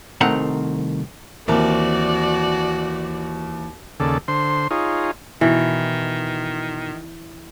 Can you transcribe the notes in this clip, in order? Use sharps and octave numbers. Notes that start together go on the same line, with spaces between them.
C2 D#3 A3 C4 F#5 A#5
D#2 E3 C4 F#4 A#4 D5
D#2 C#3 A4 D5
D3 C5 C6
D#4 F4 G#4 C#5
B2 D#3 E3